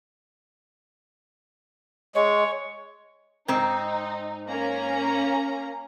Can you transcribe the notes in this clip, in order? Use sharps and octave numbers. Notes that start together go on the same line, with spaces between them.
G#3 C#5
G#2 C4 D#4
A#3 C#4 A#5